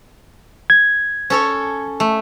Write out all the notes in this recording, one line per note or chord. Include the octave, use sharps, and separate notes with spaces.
G#6
C#4 A4 C#5
A3